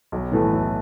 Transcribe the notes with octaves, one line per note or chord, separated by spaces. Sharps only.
B1
A2 E3 A3
B1